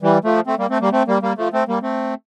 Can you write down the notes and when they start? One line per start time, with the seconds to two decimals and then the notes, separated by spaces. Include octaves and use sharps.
0.02 E3 G3
0.24 F3 A3
0.47 A3 C4
0.58 G3 A#3
0.70 A3 C4
0.81 G3 A#3
0.92 A3 C4
1.08 G3 A#3
1.22 G3 A#3
1.37 F3 A3
1.53 A3 C4
1.68 G3 A#3
1.83 A3 C4